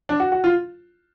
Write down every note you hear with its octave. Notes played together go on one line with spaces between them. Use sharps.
D4
F#4
F#4
F4